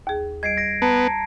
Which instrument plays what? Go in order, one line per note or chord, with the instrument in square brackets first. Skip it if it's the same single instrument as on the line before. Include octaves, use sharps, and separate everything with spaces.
[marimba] D#2 G#4
[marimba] G3 D#5 [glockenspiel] G#6 C7 D7
[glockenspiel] A#6 D7
[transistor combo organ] B3 [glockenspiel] A5 A#5 C#7